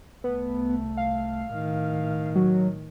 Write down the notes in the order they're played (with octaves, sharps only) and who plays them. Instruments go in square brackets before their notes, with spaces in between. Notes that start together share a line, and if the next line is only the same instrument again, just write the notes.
[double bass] C2 A3 [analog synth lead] B3
[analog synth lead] F5
[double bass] A2 D#3
[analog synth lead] F#3